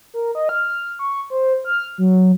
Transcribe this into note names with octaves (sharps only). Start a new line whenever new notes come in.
A#4
D#5
F6
C#6
C5
F6
F#3